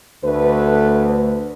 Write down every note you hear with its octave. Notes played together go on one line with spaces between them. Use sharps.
D2 A3 B4